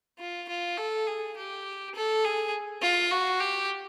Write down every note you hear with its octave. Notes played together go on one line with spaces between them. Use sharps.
F4
F4
A4
G#4
G4
A4
G#4
F4
F#4
G4